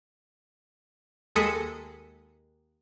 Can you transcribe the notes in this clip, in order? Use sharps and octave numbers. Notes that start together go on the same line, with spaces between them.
D#2 G#3 A4 D#6 B6 C#7